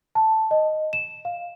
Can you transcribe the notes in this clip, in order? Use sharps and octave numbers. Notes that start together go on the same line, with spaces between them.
A5
D#5
E7
F5